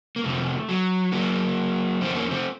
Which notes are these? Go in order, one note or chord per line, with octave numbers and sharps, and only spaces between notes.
A#3
F2 C3 D#3 A3
F#3
F#2 D#3 F#3 A#3
F2 D#3 A3 C4
A#3 C#4
A3 C4